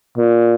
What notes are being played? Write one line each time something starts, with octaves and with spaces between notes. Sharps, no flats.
A#2